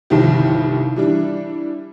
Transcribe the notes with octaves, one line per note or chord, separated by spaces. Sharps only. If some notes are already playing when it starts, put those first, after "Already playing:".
G1 C2 D#3 F3 G4
E3 G3 D4